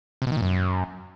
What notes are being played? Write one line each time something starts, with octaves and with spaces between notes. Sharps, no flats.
C3
B2
D#3
A#2
F#2